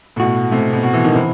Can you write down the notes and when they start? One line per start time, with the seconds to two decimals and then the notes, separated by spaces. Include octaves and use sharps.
0.16 A2
0.20 B2 F#4
0.51 C3 A3
0.73 B2
0.83 F#4
0.93 E3
1.04 D#3
1.13 C3 E3